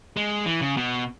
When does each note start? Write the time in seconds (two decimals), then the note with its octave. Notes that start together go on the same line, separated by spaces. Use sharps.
0.16 G#3
0.46 E3
0.61 C#3
0.77 B2